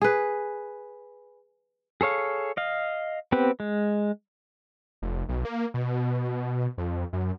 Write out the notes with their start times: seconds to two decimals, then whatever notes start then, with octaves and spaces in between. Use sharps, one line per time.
0.02 G#4 B4
2.01 G#4 A4 C#5 F5
2.57 D#5 F5
3.32 B3 C4 G4 B4
3.60 G#3
5.02 F1
5.29 B1
5.45 A#3
5.74 B2
6.78 F2
7.13 F#2